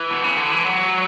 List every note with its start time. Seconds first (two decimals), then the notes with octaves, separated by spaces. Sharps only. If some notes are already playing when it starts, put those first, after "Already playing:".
Already playing: E3
0.10 B2
0.24 C#3
0.37 D3
0.51 E3
0.64 F#3